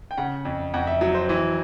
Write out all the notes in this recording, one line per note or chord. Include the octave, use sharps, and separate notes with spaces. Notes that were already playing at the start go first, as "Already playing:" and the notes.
G5
C#3 F#5
F2
F2 F#5
E5
F#3
C5
E3